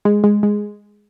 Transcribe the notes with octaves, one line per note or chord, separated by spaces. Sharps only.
G#3
G#3
G#3